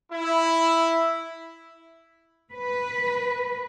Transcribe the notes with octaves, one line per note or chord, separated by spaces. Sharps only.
E4
B4